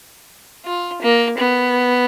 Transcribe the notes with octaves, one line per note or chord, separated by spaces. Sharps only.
F4
A#3
B3